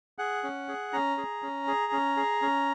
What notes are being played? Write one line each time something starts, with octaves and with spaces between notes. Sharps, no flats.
G#4 F#5
C#4
G#4
C#4 A#5
G#4
C#4
G#4
C#4
G#4
C#4